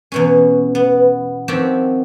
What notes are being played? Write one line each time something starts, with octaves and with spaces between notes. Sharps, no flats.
E2 B2 C#4
B3
D#3 F3 C4 F#4 G4 E5